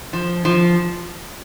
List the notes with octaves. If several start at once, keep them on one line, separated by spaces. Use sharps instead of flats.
F3
F3